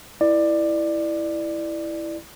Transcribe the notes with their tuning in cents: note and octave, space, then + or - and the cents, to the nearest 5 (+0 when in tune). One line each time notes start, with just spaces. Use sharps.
E4 +0 B4 +0 D5 +20